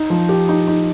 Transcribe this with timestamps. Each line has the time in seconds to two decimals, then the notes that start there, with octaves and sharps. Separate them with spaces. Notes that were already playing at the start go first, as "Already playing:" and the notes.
Already playing: D#4
0.10 F3
0.29 G4
0.49 D#4
0.68 D#4